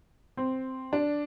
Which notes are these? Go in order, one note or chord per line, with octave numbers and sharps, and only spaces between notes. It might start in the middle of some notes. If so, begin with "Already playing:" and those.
C4
D4